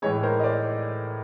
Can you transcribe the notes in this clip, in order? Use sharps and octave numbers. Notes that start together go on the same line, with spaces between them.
A2 E3 G#3 C#5 D#5
A#4 C5
D#5
C5 D5